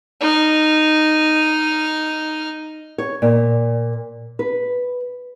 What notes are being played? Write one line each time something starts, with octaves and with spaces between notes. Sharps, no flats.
D#4 F6
C#5
A#2
B4